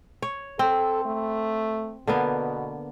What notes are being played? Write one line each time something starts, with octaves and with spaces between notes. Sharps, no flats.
C#5
C4 A4
A3
B2 D3 A#3 B3